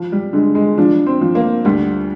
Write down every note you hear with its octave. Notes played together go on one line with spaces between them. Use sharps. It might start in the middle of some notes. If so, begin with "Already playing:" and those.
Already playing: F3
G3
D3 G#3
G#3
F3 D4
C4
F3
A#3
D2 G3